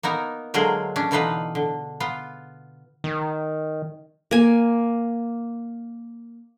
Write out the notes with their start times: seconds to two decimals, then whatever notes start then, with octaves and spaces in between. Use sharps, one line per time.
0.03 A#3 B3 D#4 A#4
0.54 D3 F#3 G#3 F4 G#4 A#4
0.96 C#4 D4
1.11 B2 D3 E3 D#4 F4 B4
1.55 D3
2.00 B3 F4
3.04 D#3
4.31 A#3 G#5